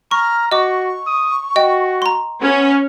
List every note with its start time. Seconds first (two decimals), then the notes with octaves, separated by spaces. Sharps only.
0.11 A#5 C#6 F6
0.51 F#4 D#5 C#6 D6
1.07 D#6
1.56 F#4 D#5 G5
2.02 A#5 C6
2.41 B3 C#4